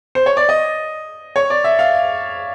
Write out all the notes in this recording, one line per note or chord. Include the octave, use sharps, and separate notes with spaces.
C5
C#5
D5
D#5
C#5
D5
E5
F5